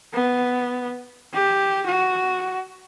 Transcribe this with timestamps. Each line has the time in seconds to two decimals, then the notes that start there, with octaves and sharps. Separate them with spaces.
0.14 B3
1.34 G4
1.86 F#4